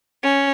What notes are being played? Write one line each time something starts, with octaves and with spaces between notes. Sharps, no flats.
C#4